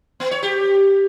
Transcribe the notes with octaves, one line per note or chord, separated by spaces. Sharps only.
B3
C#5
G4